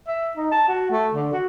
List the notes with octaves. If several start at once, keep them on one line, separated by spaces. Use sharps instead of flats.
E5
D#4
A5
F#4
A3
D3
F#4